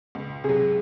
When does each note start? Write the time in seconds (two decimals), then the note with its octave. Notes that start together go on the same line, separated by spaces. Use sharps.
0.15 C#2
0.44 C3 F#3 G#4